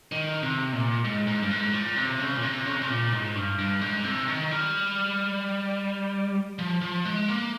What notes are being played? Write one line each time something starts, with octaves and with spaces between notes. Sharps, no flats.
D#3
C3
A#2
G#2
G#2
G2
G#2
A#2
C3
C#3
A#2
C3
C#3
C3
C#3
A#2
G#2
G2
G2
G#2
C3
D#3
G3
F3
F3
G#3
A#3